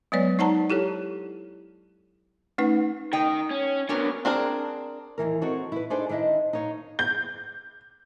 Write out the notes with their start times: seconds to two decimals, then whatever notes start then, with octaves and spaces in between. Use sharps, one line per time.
0.12 F#3 G#3 B3 B4 C#5 D5
0.39 D#4 C5 D5 F#5 A5 A#5
0.70 E4 G4 A4 C#5
2.58 A3 C#4 D#4 B4 F#5
3.13 D#3 D#5 G5
3.51 C#4
3.89 B3 C#4 D4 F#4 A#4
4.25 C4 D4 G#4 A#4
5.18 D#2 A#2 E3 A#4
5.42 C4 D#4 F#4 A4 C#5
5.72 E4 B4
5.90 D4 D#4 G#4 A4 C5 D5
6.09 D#3 D4 E4 D#5 E5
6.53 D#4 C#5 F5
6.99 G6